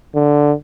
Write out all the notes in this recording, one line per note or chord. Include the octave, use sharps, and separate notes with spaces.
D3